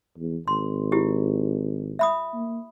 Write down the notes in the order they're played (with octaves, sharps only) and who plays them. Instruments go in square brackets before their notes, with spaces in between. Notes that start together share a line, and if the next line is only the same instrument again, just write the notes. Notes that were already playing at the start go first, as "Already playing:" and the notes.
[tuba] E2
[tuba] G#1 [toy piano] C6
[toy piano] E4 F4 G4
E5 B5 D#6
[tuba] A#3